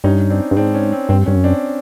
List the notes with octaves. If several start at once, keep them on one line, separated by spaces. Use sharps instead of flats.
G2 C#4 D#4
C4 D4
G2
G#2 C4 D4
C#4
C4
G2 C4
G2 C#4
F#2
C4 D4